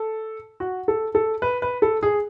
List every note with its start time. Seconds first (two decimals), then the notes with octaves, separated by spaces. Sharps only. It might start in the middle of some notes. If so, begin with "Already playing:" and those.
Already playing: A4
0.60 F#4
0.88 A4
1.15 A4
1.42 B4
1.62 B4
1.82 A4
2.03 G#4